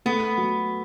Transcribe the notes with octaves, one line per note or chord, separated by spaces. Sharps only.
A3 B3
F#3